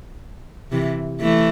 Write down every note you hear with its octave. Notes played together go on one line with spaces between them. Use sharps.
C3 E3
E3 A3